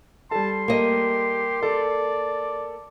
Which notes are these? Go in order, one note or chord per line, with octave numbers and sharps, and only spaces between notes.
G3 A4 A5 C6
A#3 G4 D#5
A4 D5